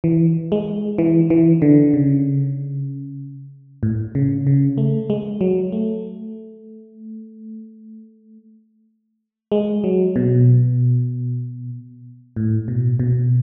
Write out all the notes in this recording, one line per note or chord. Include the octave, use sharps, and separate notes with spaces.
E3
G#3
E3
E3
D3
C#3
A2
C#3
C#3
A3
G#3
F#3
A3
G#3
F#3
B2
A2
B2
B2